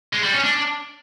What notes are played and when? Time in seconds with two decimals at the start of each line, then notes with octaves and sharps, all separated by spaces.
0.13 G#3
0.23 G3
0.34 C#4
0.44 D4